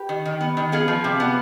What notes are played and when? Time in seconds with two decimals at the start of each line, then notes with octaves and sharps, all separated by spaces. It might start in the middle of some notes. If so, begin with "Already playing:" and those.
Already playing: G4 B4
0.09 D#3
0.26 D#3
0.41 B3
0.57 D#3
0.72 B3 F4 G#4
0.88 F3
1.04 C3
1.20 B3